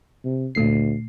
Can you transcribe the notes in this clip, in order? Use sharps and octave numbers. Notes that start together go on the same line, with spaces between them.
C3
D2 A#2 A3 C7